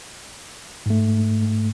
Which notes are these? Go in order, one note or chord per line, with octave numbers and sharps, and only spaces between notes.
G#2 A3